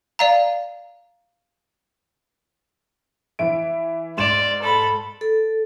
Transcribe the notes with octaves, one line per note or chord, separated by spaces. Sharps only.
D5 F5 A#5
E3 E5 D7
G#2 D5 C6 E7
A4 B5
A4